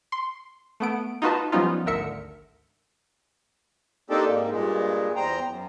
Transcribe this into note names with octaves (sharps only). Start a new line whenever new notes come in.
C6
A3 B3 D7
D#4 F4 F#4 B4 A5
F3 G3 B3 C#4 D#4 F4
G#1 D2 A#4 E5 C#7
A#3 C4 D4 D#4 G4 A4
G#2 A#3
G2 A#2 G#3
E2 C5 G5 A#5
F#2